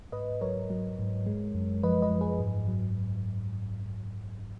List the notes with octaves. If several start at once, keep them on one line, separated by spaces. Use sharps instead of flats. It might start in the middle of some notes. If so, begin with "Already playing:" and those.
G#2 B4 D#5
F#3 A#4 C#5
F#3
G#2
G#3
F#2
F3 B4 D#5
B4 D#5
F#2
G#4 B4
G#2
F#3